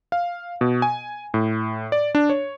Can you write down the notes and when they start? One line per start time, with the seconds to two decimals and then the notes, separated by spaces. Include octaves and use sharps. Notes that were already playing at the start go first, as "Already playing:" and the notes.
0.12 F5
0.61 B2
0.82 G#5
1.34 A2
1.92 D5
2.15 D4
2.30 C#5